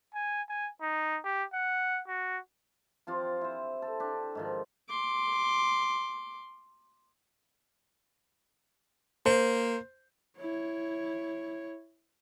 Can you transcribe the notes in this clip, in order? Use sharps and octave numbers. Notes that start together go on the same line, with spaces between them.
G#5
G#5
D#4
G4
F#5
F#4
F3 C4 F4 G4
E4 C5
A4
D4 G4
G#2 D#3 F3
C6 D6
A#3 C5
E4 C#5